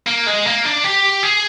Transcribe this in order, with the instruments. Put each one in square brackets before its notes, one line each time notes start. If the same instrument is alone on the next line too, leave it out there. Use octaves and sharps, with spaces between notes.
[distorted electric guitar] A#3
G#3
A#3
D4
G4
G#4